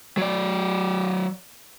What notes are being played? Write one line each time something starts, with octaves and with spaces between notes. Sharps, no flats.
F#3 D5